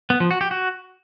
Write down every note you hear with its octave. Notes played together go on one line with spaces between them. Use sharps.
B3
F3
F#4
G4
F#4